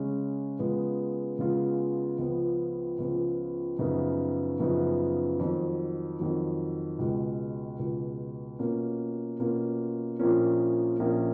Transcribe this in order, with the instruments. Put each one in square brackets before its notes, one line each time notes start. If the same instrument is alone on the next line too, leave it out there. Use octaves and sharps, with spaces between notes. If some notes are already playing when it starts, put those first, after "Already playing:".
Already playing: [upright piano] C#3 G#3 C#4
C#3 G#3 B3 F4
C#3 G#3 B3 F4
C#2 C#3 F3 B3
C#2 C#3 F3 B3
F#2 C#3 F3 B3 D#4
F#2 C#3 F3 B3 D#4
F2 D#3 F#3
F2 D#3 F#3
C#2 B2 G#3
C#2 B2 G#3
B2 A#3 C#4 F4
B2 A#3 C#4 F4
A#1 A#2 F3 A#3 C#4
A#1 A#2 F3 A#3 C#4